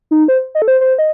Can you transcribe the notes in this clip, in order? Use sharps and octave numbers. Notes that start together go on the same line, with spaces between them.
D#4
C5
D#5
A4
C5
C5
D#5